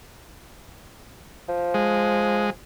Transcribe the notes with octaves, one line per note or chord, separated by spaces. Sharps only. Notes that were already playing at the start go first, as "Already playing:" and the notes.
F3
G#3